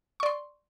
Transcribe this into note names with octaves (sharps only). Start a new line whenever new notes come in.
D5 C6 C#6